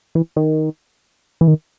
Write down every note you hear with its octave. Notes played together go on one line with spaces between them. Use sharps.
E3
D#3
E3
D#3